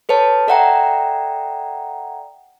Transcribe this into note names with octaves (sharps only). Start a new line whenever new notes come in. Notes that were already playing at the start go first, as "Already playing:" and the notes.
A4 B4 C#5 A5
A4 D5 E5 F#5 G5 A#5